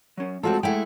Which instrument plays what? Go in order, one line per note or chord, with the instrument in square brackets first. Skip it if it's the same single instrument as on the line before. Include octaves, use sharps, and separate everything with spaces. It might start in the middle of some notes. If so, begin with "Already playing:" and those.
[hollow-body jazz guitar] F#3 C#4
[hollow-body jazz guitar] G#3 A3 F4 [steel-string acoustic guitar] C4 F#4 A4
[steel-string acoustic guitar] G#3 A3 E4 [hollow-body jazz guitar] A4 F#5 G5